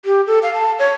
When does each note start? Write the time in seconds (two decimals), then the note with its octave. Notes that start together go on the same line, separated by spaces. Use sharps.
0.05 G4
0.27 A4
0.43 F5
0.54 A5
0.79 C#5